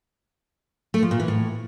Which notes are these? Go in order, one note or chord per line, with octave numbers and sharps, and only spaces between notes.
A3
F3
A#2
E3
A2